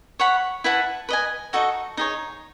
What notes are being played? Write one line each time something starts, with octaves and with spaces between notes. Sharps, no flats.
C#5 F#5 B5
E4 B4 F#5 A5
B4 D#5 G#5
D#4 F#4 A4 D#5
D#4 G#4 C#5